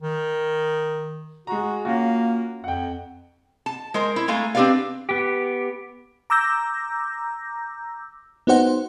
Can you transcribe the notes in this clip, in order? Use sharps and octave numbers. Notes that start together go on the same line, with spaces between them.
D#3
G#3 F#4 A#5
A#3 C#4 F4 F#4
F2 F#5 G5
A5
G#3 A#4 C5
E4
G#3 A3 F5 G#5 A#5
C4 D4 G4 B4 D5 F5
B3 G4
A#5 D6 E6 G6 A#6
B3 D#4 F#4 C5 F#5